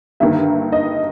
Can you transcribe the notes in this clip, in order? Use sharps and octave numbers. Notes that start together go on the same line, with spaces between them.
G1 G2 D#3 A#3 E5
D#5